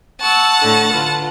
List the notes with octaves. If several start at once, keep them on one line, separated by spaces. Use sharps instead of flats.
F#5 A5 C#6 E6
A2 D3 C#6
D3 F4 B4